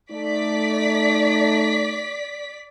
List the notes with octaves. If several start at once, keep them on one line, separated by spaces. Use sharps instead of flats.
A3 D#4 D5 B6